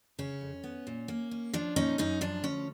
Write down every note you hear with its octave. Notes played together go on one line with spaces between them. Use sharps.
C#3 C#4
F2
B3
A#2
A#3
C#4
F3 D4
A#2 C#4 D#4
F#2 C#4 D#4
F3 D4
D2 C#4